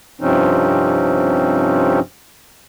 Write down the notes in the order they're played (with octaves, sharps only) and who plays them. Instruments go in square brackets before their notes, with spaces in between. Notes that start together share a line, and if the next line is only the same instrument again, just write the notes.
[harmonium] G2 C3 F3 C4 C#4 D#4